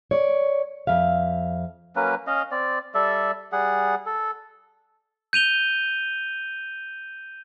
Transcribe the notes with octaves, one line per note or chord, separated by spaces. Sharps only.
C#5 D5
F2 E5 F5
F#3 A#3 C#4 B4
C#4 D#5 F5
C4 D5
G3 A4 D5 E5
G3 G#4 F#5
A4
G6 D#7 F7 G7